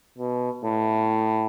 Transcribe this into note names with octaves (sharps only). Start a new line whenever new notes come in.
B2
A2